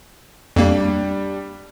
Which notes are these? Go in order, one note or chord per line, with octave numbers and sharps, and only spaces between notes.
F2 G3 A#3 D4